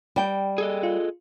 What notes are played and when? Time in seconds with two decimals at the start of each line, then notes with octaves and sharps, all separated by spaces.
0.16 G3 G5
0.58 G#4 A4 D#5
0.83 F4